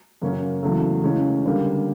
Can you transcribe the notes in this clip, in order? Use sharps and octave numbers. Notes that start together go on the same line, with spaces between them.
F#2 C#3 F#3 A#3 C#4
E2 C#3 F#3 A3
C#3 E3 G#3 C#4
D3 G3 A#3